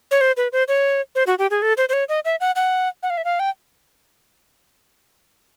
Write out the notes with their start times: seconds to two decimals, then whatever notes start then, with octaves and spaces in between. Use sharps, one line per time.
0.11 C#5
0.21 C5
0.37 B4
0.52 C5
0.68 C#5
1.15 C5
1.27 F#4
1.39 G4
1.51 G#4
1.62 A4
1.77 C5
1.89 C5
1.93 C#5
2.09 D#5
2.25 E5
2.40 F#5
2.56 F#5
3.03 F#5
3.10 F5
3.17 E5
3.25 F5
3.40 G5